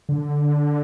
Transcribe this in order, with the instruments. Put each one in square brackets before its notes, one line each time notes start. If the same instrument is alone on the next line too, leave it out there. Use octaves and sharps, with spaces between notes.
[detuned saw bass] D3